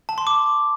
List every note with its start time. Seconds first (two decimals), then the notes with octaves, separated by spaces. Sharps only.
0.09 A5
0.18 C6
0.27 D6